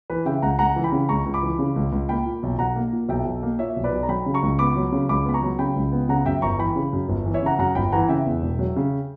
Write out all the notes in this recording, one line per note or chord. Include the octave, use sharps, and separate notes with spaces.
E3 B4
C#3 E5 G5
C#2 F#5 A#5
C#2 F#5 A#5
E3
G5 B5
C#3
C#2 A#5 C#6
C#2
B5 D6
E3
C#3
C#2
C#2
A#3 G5 B5
A#2
B1
B1 F#5 A#5
A#3
A#2
B1 E5 G5
B1
A#3
A#2 C#5 E5
B1
B4 D5
B1
A#5
F#3 G5 B5
C#3
A#5 C#6
C#2
B3 B5 D6
F#3
C#3
C#2 B5 D6
B3 B5
A#5 C#6
F#3
C#3 G5 B5
C#2
B3
C#3 F#5 A#5
F#2 E5 G5
G1 A#5 C#6
E3 G5 B5
C#3
F#2
G1
E3
C#5 E5
C#3 F#5 A#5
F#2 F#5 A#5
G1 G5 B5
E3 F#5 A#5
C#3 E5 G5
E2
E1
F#3
C#3